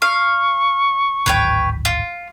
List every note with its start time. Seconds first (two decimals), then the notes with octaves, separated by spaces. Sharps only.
0.02 F5 C#6
1.26 D1 G#1 B4 C#5 G5
1.85 F4